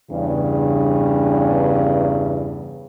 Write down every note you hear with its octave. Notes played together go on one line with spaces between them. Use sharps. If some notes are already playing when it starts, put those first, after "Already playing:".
E2 G2 C#3